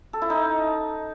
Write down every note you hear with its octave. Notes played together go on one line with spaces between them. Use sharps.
A4
E4
D#4